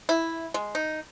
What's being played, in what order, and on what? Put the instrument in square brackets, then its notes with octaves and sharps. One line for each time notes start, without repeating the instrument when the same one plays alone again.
[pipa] E4
G#3
D#4